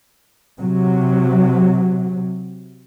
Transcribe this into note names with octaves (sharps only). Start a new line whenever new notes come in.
C3 F#3